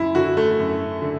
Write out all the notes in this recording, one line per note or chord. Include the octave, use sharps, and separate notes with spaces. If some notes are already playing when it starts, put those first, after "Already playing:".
Already playing: F#2 E4
D3 F#4
A3
F#2
D3